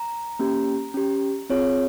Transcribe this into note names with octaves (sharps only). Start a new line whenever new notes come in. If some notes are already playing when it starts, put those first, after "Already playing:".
Already playing: A#5
A#3 C#4 G4
C#4 G4
C4 F4 G#4 C#5